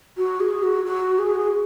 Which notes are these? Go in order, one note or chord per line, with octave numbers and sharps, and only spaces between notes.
F#4
G#4
F#4
F#4
G#4